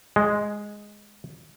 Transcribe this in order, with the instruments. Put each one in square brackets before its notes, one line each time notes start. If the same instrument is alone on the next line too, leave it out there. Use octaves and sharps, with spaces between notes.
[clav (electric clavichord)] G#3